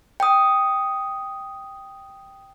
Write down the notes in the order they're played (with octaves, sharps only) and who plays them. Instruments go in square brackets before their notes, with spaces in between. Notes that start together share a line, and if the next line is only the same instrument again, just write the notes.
[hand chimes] G5 D#6